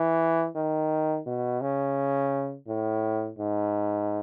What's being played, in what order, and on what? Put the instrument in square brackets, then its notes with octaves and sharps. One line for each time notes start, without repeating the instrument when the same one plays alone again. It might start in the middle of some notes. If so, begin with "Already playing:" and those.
Already playing: [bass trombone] E3
D#3
B2
C#3
A2
G#2